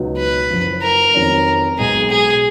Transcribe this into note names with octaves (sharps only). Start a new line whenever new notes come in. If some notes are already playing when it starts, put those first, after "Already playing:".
Already playing: C#2 B2 F#3 B3 D#4
B4
F#1 F#2 F3
A#4
F1 F2 D#3 F#3 C#4
B1 B2 G#3 G#4
G#4